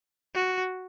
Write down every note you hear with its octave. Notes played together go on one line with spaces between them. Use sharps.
F#4